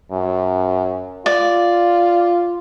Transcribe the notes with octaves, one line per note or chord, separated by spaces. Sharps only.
F#2
F4 D5